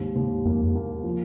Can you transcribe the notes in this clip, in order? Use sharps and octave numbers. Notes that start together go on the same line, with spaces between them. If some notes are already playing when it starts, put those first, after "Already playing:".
Already playing: D#2 G#2
D#2
F2 A#3
A#3
F3